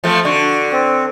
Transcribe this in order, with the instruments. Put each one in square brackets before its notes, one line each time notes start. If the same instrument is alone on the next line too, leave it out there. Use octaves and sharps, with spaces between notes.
[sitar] F3 A3 C4
[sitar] D3 [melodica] F#4
[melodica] C4